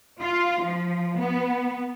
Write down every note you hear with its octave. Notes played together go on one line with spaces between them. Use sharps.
F4
F3
B3